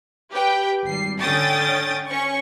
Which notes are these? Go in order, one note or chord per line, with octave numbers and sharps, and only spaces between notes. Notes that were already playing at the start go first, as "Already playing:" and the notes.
G4 B4 G5
G#1 G3 C7
D3 C#4 G5 D#6 A6
C#4 C#6